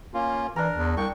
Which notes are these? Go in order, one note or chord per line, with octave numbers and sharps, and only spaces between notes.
A#3 C#4 F4
E3 D4 A#4 A#5
E2
C2 G5 C#6